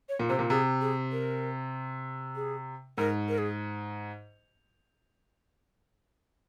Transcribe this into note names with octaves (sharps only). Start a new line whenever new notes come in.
C#5
A#2
C3 C5
A#2
C3 G#4
G#4
A#4
G#4
G#2 A#4
A#4
G#4